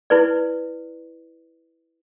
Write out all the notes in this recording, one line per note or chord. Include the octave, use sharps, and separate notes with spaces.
E4 B4 D5